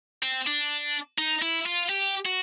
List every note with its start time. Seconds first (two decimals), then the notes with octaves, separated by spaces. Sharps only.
0.23 C4
0.47 D4
1.18 D#4
1.42 E4
1.66 F4
1.89 G4
2.25 F#4